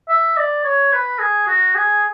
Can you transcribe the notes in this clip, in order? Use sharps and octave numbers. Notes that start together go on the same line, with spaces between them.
E5
D5
C#5
B4
G#4
F#4
G#4